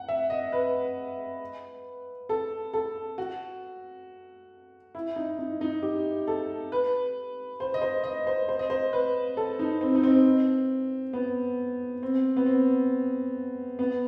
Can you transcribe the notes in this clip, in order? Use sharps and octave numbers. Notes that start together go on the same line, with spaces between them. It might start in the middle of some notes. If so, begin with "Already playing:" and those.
Already playing: F#5
E5
D#5
B4
A4
A4
F#4
E4
D#4
D#4
D#4
G4
A4
B4
C5
D#5
C5
D#5
C5
C5
D#5
C5
B4
A4
D#4
C4
D#4
C4
B3
C4
B3
C4
B3